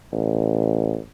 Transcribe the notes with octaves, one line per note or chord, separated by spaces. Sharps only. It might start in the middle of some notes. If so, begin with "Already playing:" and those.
A1